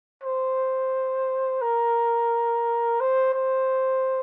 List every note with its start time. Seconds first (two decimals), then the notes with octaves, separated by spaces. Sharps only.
0.23 C5
1.61 A#4
3.00 C5
3.34 C5